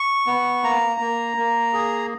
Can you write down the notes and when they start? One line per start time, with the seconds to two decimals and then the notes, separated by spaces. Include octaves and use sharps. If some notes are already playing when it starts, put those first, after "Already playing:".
Already playing: C#6
0.27 B3
0.63 A#3 A#5
1.00 A#3
1.37 A#3
1.73 G#4